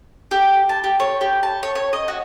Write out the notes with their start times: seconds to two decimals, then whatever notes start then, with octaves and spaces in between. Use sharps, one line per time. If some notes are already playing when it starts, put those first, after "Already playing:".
0.31 G4
0.69 A5
0.84 G4
1.00 C#5
1.21 G4
1.43 A5
1.63 C#5
1.75 C#5
1.93 D#5
2.08 F#4